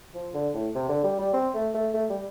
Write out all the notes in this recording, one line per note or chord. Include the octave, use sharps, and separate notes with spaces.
F3
D3
A2
C3
D3
G3
G3
C4
A3
A3
A3
G3